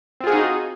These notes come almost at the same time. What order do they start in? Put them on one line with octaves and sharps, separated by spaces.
C4 F4 G#4 F#4 D#4